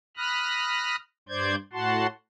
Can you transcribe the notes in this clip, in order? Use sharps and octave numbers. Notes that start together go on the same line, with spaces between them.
B5 D#6 F6 F#6 A#6
G2 C5 D5 G6 G#6
A2 F#4 F#5 A5 C6